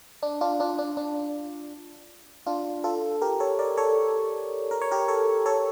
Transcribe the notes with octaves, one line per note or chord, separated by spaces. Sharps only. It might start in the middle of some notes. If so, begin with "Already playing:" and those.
D4
D4 F4
D4 F4
D4
D4
D4 F4
F4 A4
G4 A#4
A4 C#5
A#4 D5
A4 C#5
A#4
C#5
G4 A#4
A4 C#5
A4 C#5